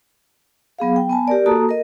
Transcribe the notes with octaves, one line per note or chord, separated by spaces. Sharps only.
F#3 B3 G#4 F5
G5
B3 G#5 A5
G4 A#4 D5
A#3 F#4 A4 A5 A#5 D#6
A#4 D#5